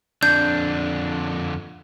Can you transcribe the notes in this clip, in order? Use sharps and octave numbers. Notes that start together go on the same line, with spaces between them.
F2 D3 D4 G6